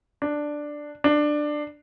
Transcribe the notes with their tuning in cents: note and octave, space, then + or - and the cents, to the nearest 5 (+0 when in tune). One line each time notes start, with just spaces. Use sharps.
D4 +5
D4 +15